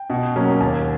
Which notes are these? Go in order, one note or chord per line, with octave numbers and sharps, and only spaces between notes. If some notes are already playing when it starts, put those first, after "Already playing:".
Already playing: G5
B2
F#3 A#3 C#4
D#2 G#5